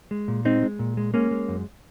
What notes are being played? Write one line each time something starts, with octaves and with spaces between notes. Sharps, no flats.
G#3
A#2
G#3 C4 D#4
G#3
A#2
G#3
G#3 A#3 C#4
G#3
F#2